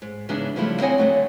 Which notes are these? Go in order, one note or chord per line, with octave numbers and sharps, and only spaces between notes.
G#2
C#3 E3 G#3 B3 D4 D#4
C#3 F3 G3 A3 E4 F4
C4 E4 C#5 D#5 F#5 G#5
D3 F#3 A3